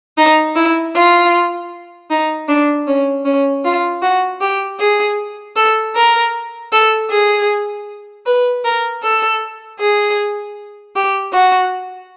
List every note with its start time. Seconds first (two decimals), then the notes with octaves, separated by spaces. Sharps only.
0.18 D#4
0.56 E4
0.95 F4
2.10 D#4
2.48 D4
2.87 C#4
3.25 C#4
3.64 F4
4.02 F#4
4.41 G4
4.80 G#4
5.56 A4
5.95 A#4
6.72 A4
7.10 G#4
8.26 B4
8.64 A#4
9.03 A4
9.80 G#4
10.95 G4
11.33 F#4